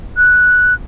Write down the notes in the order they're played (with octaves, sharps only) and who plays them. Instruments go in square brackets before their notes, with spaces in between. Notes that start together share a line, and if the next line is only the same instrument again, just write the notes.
[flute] F#6